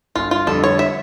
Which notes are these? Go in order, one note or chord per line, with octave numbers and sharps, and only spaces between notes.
G1 F4
F4
F2 D3 G3 A4
C#5
E5